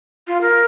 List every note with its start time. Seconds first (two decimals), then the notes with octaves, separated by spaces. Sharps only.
0.28 F4
0.42 A#4